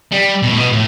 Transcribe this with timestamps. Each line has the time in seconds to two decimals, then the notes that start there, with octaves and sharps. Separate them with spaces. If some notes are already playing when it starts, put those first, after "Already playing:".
0.12 G3
0.43 B2
0.51 A2
0.57 B2
0.72 A2